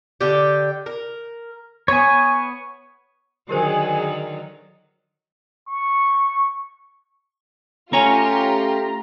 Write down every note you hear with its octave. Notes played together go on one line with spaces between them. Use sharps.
D3 G4
A#4
B3 C#5 G#5
D3 D#3 F#3 G4 G#4 A#4 C5
C#6
A3 C#4 F4 G4 C#5 G#5 A#5